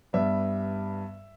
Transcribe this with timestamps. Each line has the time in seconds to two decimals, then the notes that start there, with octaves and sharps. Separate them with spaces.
0.13 G2 G3 B3 E5